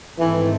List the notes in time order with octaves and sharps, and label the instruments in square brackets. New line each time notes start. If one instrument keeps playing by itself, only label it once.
[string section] G#1 G#2 D#3 A3 C4 [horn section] E3